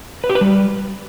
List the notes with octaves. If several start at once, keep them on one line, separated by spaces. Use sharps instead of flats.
B4
G4
B4
G3